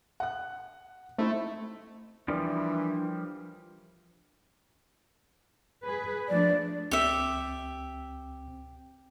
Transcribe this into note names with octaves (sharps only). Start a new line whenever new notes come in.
F#5 F#6
A3 C4 D#4 E4
E3 F3 G3 D4 A#4 D5
G#4 B4
F3 A3 D4 D5
C#2 C4 G4 E5